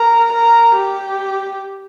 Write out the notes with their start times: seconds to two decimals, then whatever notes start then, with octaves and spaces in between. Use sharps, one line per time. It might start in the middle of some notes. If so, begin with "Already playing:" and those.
Already playing: A#4
0.32 A#4
0.77 G4